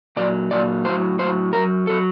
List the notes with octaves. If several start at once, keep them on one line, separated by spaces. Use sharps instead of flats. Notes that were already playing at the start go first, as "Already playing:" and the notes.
A#2 F#3 D5
A#2 F#3 D5
A2 F#3 C5
A2 F#3 C5
F#2 F#3 A#4
F#3 A4